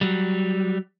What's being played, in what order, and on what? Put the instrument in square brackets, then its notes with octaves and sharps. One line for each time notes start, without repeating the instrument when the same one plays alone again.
[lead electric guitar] F#3 G3